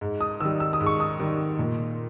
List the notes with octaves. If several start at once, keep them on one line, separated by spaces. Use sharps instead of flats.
G#2
D#6
D#3 G3 E6
E6
D#6
G#2
C#6
D#6
D#3 G3
A#2